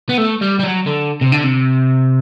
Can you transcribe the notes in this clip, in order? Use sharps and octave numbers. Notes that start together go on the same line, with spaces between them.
B3
A3
G3
G3
F#3
D3
C3
D3
C3